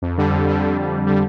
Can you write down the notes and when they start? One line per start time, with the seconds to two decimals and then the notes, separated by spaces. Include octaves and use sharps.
0.02 F2
0.18 D3 G3
0.32 F2
0.48 D3 G3
0.62 F2
0.77 D3 G3
0.92 F2
1.07 D3 G3